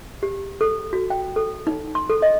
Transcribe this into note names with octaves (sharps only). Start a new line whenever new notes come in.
G4
A4
F#4
G5
A4
D#4
C6
A4
D#5